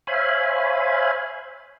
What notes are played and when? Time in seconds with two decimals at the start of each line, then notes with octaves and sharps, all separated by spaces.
0.07 C5 C#5 E5 F5 G#5 B5